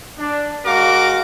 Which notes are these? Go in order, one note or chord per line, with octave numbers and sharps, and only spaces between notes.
D4
G#3 F#4 A#4 F5 D6